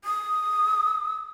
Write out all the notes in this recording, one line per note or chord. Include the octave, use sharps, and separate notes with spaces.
D#6